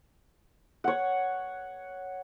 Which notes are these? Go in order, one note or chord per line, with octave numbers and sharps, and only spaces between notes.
C#5 F#5